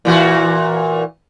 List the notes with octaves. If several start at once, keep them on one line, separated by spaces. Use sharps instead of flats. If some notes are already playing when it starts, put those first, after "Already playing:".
A#2 E3 F#4